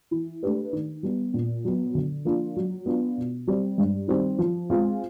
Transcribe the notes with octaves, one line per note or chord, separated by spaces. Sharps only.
E3
A3 D4 G4 B4
D#3
G3 B3
A#2
F#3 B3
D3
F3 A#3 D4 F4
F#3
B3 D4 F4
B2
G3 C4
G2
D#3 G3 C4
F3
G#3 C4 F4